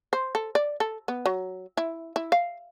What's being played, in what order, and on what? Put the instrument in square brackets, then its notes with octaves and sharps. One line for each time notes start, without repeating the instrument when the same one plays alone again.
[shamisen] C5
A4
D5
A4
B3
F#3
E4
E4
F5